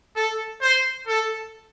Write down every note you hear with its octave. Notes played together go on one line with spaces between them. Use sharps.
A4
C5
A4